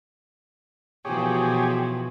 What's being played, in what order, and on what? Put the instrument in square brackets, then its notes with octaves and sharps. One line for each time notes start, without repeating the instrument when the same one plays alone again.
[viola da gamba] B2 E3 F3 [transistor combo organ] G4 G#4 C#5